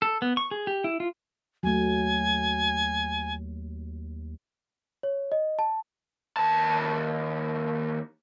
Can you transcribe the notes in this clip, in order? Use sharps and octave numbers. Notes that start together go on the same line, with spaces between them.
A4
B3
C#6
G#4
G4
E4
F4
D#2 F#3 A3 G#5
C#5
D#5
A5
D#2 A5